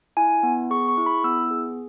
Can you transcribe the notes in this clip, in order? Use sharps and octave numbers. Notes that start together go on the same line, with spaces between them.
E4 G#5
B3
G#4 C#6
C#6
E4
B5
B3 E6
G#4